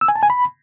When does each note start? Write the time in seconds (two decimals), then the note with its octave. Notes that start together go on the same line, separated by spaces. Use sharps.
0.01 E6
0.08 G#5
0.16 A5
0.23 G#5
0.30 B5